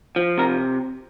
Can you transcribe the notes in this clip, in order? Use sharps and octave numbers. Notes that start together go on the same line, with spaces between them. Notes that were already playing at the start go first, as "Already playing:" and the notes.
F3
C3 A#4